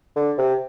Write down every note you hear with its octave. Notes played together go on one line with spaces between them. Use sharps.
D3
C3